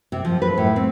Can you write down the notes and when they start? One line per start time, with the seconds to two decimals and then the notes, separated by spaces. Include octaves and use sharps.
0.12 C3
0.25 F3
0.42 B4
0.58 A2
0.76 C4